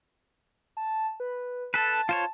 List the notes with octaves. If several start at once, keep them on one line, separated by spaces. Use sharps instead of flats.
A5
B4
A4 B4 A5
F4 C5 C#5